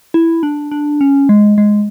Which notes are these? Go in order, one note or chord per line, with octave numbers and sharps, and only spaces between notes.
E4
D4
D4
C#4
G#3
G#3